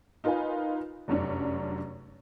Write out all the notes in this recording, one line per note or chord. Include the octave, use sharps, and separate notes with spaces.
D#4 F4 A#4 B4 G#5
F1 F#2 C#4 D4